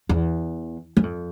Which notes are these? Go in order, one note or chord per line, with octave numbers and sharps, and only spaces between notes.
E2
F#2
F2